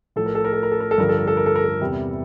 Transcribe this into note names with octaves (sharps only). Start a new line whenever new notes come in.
A2 F3 A4
A#4
A4
A#4
A4
A#4
A4
A#4
A4
G2 D3 F3 A#4
A4
A#4
A4
A#4
A4
A#4
A4
E2 C3 E3 G3